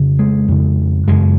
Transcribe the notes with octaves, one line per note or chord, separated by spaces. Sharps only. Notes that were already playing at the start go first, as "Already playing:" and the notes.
Already playing: F2 C#3
G#3
F2 C#3
F#2 C#3 G#3